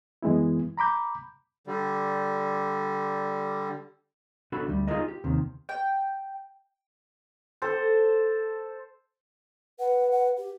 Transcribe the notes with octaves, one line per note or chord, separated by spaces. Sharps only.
F#2 E3 G#3 B3 E4
A#5 B5 D6 G6
D3 G3
B1 D4 F#4 A4 B5
D2 G3
D#4 F4 G4 G#4 A#4 D#5
G4
D#2 C3 D#3
G5
A4 C5
B4 F#5
F#5
G4